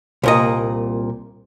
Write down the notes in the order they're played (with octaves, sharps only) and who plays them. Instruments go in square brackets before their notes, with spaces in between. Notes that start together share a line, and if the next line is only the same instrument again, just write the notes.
[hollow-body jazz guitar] C2 A#2 D#5